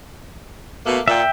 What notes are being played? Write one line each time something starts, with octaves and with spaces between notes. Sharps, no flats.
B2 A3 A#3
A#2 E5 G5